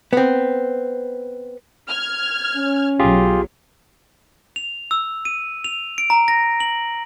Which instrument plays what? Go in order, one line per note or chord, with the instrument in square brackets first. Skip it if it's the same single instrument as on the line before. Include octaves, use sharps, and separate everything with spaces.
[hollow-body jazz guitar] B3 C4
[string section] F6 G#6
[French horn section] C#4
[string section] B1 F#3 [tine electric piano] F4 G4 G#4
[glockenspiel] F7
E6
D#7
F7
D7
A#5
A#6
F#7